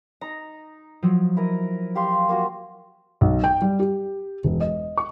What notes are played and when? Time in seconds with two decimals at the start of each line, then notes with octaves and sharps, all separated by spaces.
0.21 D#4 A#5
1.03 F3 F#3
1.37 E4 A#4 D#5
1.95 G4 F5 C6
2.29 A#3 F4 F#4
3.21 B1
3.44 G5
3.62 G3
3.79 G4
4.44 E1
4.60 D#5
4.97 C#6